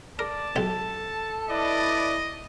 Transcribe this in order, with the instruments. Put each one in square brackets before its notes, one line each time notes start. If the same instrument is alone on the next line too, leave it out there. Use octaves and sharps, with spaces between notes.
[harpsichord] A#4 [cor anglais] D5 [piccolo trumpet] A5
[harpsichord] B1 G4 [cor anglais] A4
[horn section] E4 B4 D5 [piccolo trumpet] D#5